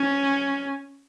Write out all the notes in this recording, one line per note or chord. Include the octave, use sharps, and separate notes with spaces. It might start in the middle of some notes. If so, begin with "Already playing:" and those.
Already playing: C#4